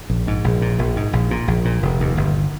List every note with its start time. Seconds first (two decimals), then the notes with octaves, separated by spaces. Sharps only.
0.10 A#1
0.27 G#2
0.44 A#1
0.62 A#2
0.79 A#1
0.96 G#2
1.13 A#1
1.31 A#2
1.48 A#1
1.65 A#2
1.83 F1
2.00 D#2
2.17 G1